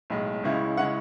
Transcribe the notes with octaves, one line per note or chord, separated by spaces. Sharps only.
B1 A2 G#3
C#2 C#3 G#3 C#4 E4
C#3 G#3 C#4 E4 F#5